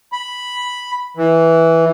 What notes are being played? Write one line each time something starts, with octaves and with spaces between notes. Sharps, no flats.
B5
E3